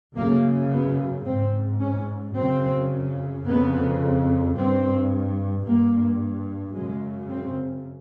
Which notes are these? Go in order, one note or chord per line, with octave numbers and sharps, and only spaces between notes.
F#2 C#3 A#3
B3
G#2 C4
C#4
F#2 C#3 C4
F2 C#3 B3
G2 C4
G2 A#3
F#2 C#3 G#3
C4